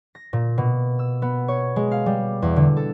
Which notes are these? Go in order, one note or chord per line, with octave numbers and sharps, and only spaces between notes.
A#6
A#2
B2
E6
B3
C#5
G#3
F5
G3
E2
D3
A4